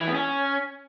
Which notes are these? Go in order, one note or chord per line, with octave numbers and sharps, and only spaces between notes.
E3
B3
C#4